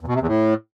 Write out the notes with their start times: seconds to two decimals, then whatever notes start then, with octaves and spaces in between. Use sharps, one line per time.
0.01 E2
0.07 B2
0.14 C3
0.21 E2
0.27 A2